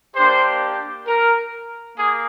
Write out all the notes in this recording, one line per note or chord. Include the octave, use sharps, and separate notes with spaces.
A#3 D4 G4 C5
A#4
A#3 G#4